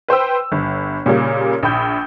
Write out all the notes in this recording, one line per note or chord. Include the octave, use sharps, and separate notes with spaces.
B4 C5 G5 E6
G1
A#2 C#3 G3 A#3
A#1 G5 B5 D#6 G6